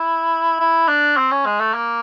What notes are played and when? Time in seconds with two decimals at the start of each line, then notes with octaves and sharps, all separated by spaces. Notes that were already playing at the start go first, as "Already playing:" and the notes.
Already playing: E4
0.60 E4
0.88 D4
1.17 C4
1.31 C#4
1.45 G#3
1.60 A3
1.74 A#3